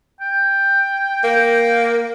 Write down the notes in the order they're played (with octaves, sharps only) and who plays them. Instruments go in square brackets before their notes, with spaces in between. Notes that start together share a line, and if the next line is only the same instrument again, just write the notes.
[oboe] G5
[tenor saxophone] A#3